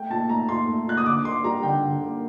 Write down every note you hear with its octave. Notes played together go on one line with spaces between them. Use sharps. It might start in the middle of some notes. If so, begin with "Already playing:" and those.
Already playing: A3 G5
A#2 A5
A3 A#5
A#2 C6
A3
A#2 F#6
D#6
D3 D6
A#3 C6
G3 A#5
D3 G5
D3
A#3